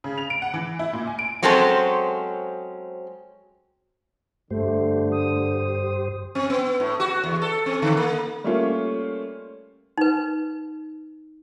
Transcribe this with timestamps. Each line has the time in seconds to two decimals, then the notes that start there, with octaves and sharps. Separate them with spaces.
0.04 C#3
0.18 F7
0.30 D7
0.42 F#5
0.54 E3
0.79 E4
0.93 A#2
1.07 G#5
1.19 D7
1.43 F#3 G#3 C4 C#4 A4 C5
4.51 G2 D3 A3 G4 C5
5.12 D#6
6.35 C4
6.50 B3
6.80 A2
7.00 F#4
7.24 E2
7.42 A4
7.66 C4
7.82 D3
7.97 A#3
8.44 G3 A3 A#3 C#4 F4
9.98 D#4 B4